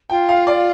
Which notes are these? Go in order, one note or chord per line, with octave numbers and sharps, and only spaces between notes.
F4 G5
F5
D5